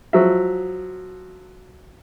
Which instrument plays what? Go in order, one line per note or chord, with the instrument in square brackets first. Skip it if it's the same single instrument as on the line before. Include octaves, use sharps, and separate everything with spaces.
[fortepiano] F3 F#3 E5